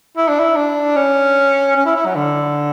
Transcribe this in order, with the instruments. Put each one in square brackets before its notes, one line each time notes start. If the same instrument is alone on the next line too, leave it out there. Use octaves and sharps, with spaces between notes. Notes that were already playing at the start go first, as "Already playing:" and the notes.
[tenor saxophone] E4
D4
E4
D4
C#4
C#4
E4
E4
F#3
D3